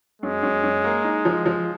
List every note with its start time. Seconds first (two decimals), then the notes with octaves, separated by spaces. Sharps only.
0.22 F#2 G#3
0.43 F#2
0.63 F#2
0.84 A#3
1.04 D#4
1.25 F3
1.46 F3